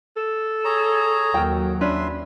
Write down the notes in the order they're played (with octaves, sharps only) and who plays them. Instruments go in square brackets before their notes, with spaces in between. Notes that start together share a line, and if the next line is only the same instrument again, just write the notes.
[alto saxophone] A4
[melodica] G#4 C#5 A#5
[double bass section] D#2 F#3 [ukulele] A#4 G5
[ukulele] C#4 D4 B4 [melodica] E5 C6